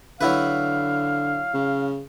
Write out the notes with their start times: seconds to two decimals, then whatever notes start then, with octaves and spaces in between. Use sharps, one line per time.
0.21 D3 F#3 E4 B4 F5
1.54 C#3